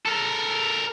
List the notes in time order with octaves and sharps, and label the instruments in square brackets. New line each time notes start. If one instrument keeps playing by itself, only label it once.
[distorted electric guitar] A4 A#4